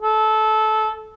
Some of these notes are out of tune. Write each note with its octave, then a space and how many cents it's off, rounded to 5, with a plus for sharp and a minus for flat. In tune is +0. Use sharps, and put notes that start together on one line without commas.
A4 -20